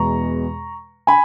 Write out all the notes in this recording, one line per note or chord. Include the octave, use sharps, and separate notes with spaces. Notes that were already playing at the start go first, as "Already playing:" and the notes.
Already playing: E2 B2 G#3 B3 A#5 C#6
G#5 B5